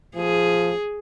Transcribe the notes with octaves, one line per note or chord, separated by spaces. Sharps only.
F3 G#4